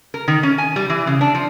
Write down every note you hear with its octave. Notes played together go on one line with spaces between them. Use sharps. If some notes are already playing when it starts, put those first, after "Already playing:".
A#4
D#3
C#4
G#5
G3
E3
C#3
D4
F3